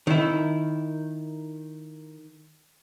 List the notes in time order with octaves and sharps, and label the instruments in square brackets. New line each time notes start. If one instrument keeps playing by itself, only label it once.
[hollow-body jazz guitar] D#3 E4